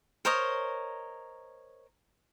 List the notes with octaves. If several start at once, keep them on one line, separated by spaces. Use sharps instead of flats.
A#4 C5 C#5 D#5